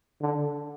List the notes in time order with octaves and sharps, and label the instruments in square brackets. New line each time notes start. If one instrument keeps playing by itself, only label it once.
[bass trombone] D3